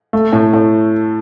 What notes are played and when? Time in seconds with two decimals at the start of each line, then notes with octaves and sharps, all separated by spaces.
0.13 A3
0.33 A2
0.53 A2